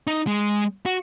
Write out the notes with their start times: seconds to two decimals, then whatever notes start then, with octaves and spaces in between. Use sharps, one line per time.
0.07 D#4
0.27 G#3
0.86 F#4